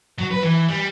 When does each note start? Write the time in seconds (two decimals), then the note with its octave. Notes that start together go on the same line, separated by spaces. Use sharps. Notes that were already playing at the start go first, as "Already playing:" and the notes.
0.18 F#3
0.31 B4
0.43 E3
0.68 G3